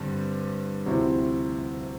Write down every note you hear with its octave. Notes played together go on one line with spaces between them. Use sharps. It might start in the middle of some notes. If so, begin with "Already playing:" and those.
Already playing: G2 D3 G3 C4
D2 C3 F3 C4 E4